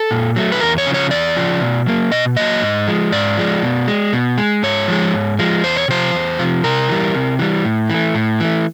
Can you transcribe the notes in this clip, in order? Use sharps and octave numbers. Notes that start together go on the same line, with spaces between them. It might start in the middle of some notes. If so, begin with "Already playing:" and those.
Already playing: A4
A#2
F#3 A3
B4
E2 A#4
C#5
C#3 F3
C#5
E2 D5
C#3 F3
B2
F#3 A#3
B2 D#5
F#3 A#3 D#5
G#2
F3 G#3
G#2 D5
F3 G#3
B2
G#3
B2
G#3
G#2 C#5
F3 G#3
G#2
F3 G#3
E2 C5
C#5
C3 F3 C5
E2
C3 F3
C3 A#4
E3 G3
C3
E3 G3
A2
E3 A3
A2
E3 A3